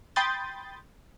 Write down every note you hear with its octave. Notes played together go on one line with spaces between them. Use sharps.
G5 B5 C6 D#6 G6 A6